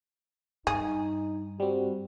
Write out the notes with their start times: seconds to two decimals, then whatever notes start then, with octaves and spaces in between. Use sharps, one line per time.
0.67 G2 D#4 G#4
1.60 G3 C4 F#4